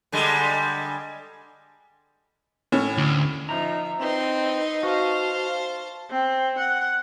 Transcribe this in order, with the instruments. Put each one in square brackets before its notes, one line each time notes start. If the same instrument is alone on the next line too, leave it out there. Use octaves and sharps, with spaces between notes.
[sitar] D3 G3 G#3
[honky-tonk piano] A2 C#4
[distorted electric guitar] D2
[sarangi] F3 [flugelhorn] D#4 [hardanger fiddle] E5 [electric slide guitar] A#5
[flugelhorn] C4 [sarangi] D#4 [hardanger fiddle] B4 C6
[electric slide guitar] F#4 [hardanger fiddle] C5 A5 [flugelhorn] F5
[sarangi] C4
F#5